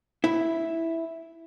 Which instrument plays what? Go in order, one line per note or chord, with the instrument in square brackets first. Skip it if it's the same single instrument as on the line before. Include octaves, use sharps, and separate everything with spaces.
[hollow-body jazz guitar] E4